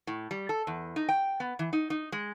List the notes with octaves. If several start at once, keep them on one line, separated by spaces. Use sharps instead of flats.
A2
G3
A4
E2
D#4
G5
B3
E3
D#4
D#4
G#3